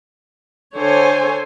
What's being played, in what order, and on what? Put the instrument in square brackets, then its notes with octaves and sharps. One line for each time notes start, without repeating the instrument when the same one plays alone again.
[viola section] D3 A4 C5 C#5 G#5